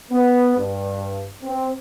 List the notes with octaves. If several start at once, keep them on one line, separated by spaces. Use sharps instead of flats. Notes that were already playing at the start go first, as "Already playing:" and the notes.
B3
G2
C4